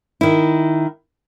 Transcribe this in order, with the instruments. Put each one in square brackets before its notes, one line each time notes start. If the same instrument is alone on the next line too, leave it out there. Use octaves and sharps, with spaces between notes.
[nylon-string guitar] D#3 E4